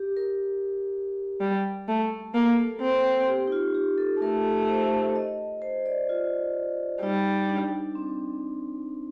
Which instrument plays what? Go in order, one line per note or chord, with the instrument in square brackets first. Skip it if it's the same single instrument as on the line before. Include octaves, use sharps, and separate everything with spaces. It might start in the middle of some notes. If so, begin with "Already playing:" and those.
Already playing: [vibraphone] G4
A#4
[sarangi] G3
A3
[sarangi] A#3 [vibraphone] A4
[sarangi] C4
[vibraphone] G4
D#4
F4
G4
A4
[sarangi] A3 [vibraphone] A#4
[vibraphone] C5
D#5
C5
D5
F4
[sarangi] G3 [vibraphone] D#4
[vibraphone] D4
C4